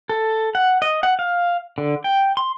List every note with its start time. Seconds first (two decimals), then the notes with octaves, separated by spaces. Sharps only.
0.09 A4
0.55 F#5
0.82 D#5
1.03 F#5
1.19 F5
1.78 D3
2.04 G5
2.37 C6